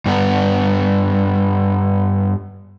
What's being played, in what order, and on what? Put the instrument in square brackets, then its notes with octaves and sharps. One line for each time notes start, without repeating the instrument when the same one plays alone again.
[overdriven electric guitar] G2 B3